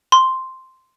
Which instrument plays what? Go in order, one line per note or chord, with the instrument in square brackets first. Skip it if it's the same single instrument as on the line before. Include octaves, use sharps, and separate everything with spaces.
[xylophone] C6